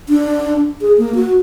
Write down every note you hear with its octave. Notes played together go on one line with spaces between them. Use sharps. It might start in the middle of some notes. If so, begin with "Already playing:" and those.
D4
G#4
A#3
F#4